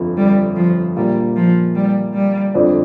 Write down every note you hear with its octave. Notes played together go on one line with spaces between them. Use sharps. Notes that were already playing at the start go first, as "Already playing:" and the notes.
Already playing: G1 F2 F3
G3
F3
A#1 A#2 G3 A#3 G4
F3
G3
G3
G1 F2 F3 D4